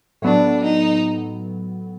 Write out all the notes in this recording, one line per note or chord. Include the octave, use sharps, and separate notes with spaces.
A2 F#3 B3 D4
D#4